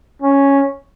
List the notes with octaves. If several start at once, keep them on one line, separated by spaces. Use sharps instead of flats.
C#4